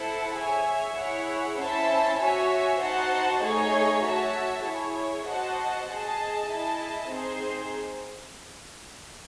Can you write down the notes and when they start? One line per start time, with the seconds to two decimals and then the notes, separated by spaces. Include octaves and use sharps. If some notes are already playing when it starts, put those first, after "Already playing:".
Already playing: E4 A4 C5 F#5 A5
0.35 G#4 C#5 E5 G#5
0.96 E4 G#4 C#5 F#5
1.58 C#4 E4 C5 E5 A5
2.19 F#4 C#5 E5 G#5
2.81 D#4 F#4 C5 F#5 A5
3.42 A3 D#4 G#4 C#5 G#5
4.04 F#4 C#5 E5 A5
4.65 E4 G#4 C#5
5.27 F#4 C5 D#5 F#5 A5
5.88 G#4 D#5 A5
6.50 E4 G#4 D#5 A5
7.11 C4 D#4 G#4 C5